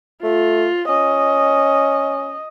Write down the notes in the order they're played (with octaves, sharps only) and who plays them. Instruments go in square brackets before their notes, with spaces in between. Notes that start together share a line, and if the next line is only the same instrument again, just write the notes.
[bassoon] A3 [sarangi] F4
[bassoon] C#4 [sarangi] D#5